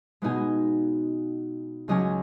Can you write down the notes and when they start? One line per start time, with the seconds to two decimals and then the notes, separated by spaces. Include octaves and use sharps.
0.22 B2 G#3 B3 D#4 D#5 G#5
1.88 C#2 C#3 F#3 C#4 D#5 G#5